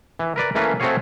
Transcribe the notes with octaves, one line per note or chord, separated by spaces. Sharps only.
E3
A#4 B4 D5
E3 A3 A#3 C#4 B4
A3 C4 F#4 G#4 C#5 F5